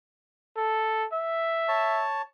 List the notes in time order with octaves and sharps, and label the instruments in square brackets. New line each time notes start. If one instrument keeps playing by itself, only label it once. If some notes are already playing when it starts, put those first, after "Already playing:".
[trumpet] A4
E5
[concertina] C#5 A5